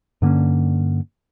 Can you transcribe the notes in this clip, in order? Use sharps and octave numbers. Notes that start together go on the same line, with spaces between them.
G2 D3 A#3 C#4